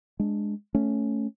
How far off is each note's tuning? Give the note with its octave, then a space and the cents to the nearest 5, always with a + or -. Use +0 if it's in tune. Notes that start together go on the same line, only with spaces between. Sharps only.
G#3 +0 D4 +0
A3 +0 C#4 +0